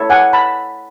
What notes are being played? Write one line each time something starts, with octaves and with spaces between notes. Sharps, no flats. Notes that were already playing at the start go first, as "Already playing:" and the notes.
Already playing: E4 A4 C#5
F#5 G#5
A5 B5